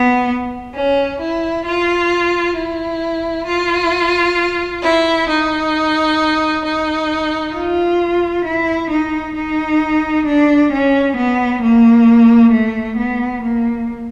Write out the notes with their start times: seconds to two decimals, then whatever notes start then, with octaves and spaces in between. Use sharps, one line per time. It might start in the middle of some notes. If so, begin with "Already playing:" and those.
Already playing: B3
0.74 C#4
1.19 E4
1.65 F4
2.55 E4
3.46 F4
4.81 E4
5.27 D#4
6.63 D#4
7.53 F4
8.44 E4
8.89 D#4
9.34 D#4
10.25 D4
10.71 C#4
11.16 B3
11.61 A#3
12.52 A3
12.96 B3
13.42 A#3